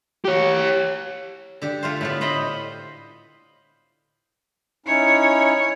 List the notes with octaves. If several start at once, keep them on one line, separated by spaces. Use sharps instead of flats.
G4 C#5
D3 G4
A3 F4 C5
A2 A3 B3
B4 C5 D#5 B5 C6
C#4 D#4 E4 C#5